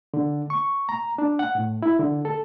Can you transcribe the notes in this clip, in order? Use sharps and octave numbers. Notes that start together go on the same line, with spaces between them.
D3
C#6
A#5
D4
F#5
A2
E4
D3
A4